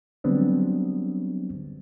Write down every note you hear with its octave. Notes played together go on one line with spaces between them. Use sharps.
D3 F#3 G3 B3 C4 D4